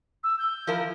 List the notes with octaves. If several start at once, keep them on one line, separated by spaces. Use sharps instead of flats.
E6
G6
F3 E4 A#4